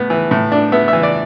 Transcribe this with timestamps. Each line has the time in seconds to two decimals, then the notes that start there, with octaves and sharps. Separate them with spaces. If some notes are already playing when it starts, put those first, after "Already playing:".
Already playing: A2 B3
0.10 E3
0.31 A2
0.52 D4
0.72 B3 E5
0.88 E5
0.93 E3
1.03 D5